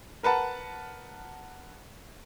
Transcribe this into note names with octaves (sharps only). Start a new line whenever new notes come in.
A#4 B4 F#5 A5